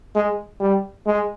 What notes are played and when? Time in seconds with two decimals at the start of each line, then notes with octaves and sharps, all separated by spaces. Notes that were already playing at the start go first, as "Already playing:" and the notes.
0.15 G#3
0.60 G3
1.06 G#3